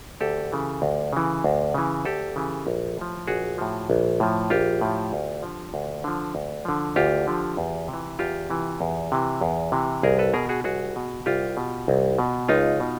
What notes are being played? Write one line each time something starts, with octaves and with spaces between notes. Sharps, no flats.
D2 G4 A4
C#3 E3
D2
C#3 E3
D2
C#3 E3
D2 G4 A4
C#3 E3
A#1
A2 F3
A#1 F#4 G#4
A2 F3
A#1
A2 F3
A#1 F4 G4
A2 F3
D2
D3 F3
D2
D3 F3
D2
D3 F3
D2 F4 G4
D3 F3
E2
C3
E3
E2 F4 G4
C3 E3
E2
C3 E3
E2
C3 E3
C2 G#4 A#4
A4 B4
B2 G#4 A#4
F#4 G#4
C2 F#4 G#4
B2
C2 F4 G4
B2
C2
B2
C#2 D#4 F4
B2